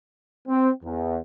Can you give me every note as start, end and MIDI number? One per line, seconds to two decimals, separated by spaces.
0.48 0.70 60
0.84 1.18 40